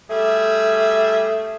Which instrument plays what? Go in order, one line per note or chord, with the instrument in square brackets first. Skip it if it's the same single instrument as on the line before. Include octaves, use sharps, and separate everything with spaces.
[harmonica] G3 G#4 E5 [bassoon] A3